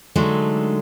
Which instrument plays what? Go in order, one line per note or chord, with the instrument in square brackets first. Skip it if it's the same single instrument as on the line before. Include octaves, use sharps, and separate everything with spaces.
[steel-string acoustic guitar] D3 F#3 G#3 A3 D4 D#4